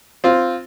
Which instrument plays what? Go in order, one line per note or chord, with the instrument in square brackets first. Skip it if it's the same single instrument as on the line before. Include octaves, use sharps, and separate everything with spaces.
[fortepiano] C4 F4